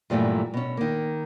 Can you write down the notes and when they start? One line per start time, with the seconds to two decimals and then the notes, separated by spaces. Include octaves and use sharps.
0.10 G2 A#2 E3 F#3 A3
0.54 B2 C#4
0.77 D#3 A#3